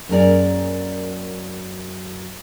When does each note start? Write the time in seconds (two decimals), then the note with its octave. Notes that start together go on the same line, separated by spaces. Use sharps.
0.09 F#2 A#3 G#4 A#4 D5